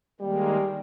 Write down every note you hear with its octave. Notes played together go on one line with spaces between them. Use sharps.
D#3 G3 G#3 A#3